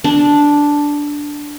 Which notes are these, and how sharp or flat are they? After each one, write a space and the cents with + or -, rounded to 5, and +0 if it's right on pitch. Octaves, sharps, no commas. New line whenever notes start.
D4 -5